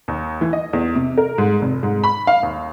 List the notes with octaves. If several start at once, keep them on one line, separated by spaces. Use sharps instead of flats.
D#2
E3
D#5
E2
C3
A#4
G#2
F1
G#2
B5
F5
D#2